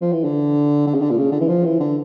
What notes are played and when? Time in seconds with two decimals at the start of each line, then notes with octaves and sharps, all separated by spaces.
0.02 F3
0.13 E3
0.24 D3
0.87 D3
0.94 C#3
1.01 D3
1.11 A#2
1.18 C#3
1.32 D3
1.41 E3
1.49 F3
1.65 E3
1.80 D3